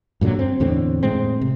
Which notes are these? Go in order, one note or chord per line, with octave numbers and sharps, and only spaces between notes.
G2 A#2 D3 F#3
C4
E2 A2 D3 C4
A2 G#3 C4
C3